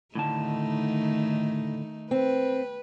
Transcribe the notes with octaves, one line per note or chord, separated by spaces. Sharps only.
A2 D3 D#3 A3 D#4 A5
C4 B4